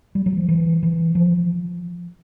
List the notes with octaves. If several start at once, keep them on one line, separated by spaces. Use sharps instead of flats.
G3
F#3
F3
E3
E3
F3